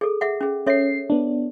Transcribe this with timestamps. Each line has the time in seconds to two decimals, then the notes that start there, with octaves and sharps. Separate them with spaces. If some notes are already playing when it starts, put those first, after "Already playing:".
0.01 G#4 A4
0.21 G#4 E5 F#5
0.41 C#4 G#4
0.67 C#4 A4 C#5 E5 C7
1.10 B3 D4